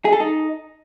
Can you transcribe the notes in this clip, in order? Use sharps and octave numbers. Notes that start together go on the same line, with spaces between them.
G#4
A4
D#4